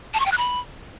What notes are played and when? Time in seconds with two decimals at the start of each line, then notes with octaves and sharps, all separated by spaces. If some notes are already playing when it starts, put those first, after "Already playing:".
0.14 A5
0.20 C#6
0.26 G5
0.32 F#6
0.38 B5